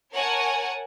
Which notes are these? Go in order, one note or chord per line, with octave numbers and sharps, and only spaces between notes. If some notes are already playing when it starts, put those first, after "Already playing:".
A#4 C#5 F#5 G#5 A5